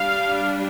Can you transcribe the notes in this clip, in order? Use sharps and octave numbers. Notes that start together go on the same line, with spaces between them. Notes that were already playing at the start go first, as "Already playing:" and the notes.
Already playing: G3 D4 F5